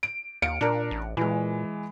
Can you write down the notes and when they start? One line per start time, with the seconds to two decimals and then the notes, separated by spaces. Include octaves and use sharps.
0.03 D7
0.42 D#2 F5 C#7 D7
0.61 A#2 D4 A#4
0.91 A1
1.17 A#2 E3 G#3